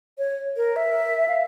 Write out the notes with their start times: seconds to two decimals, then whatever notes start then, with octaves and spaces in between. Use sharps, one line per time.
0.18 C#5
0.57 A#4
0.76 E5
1.28 F5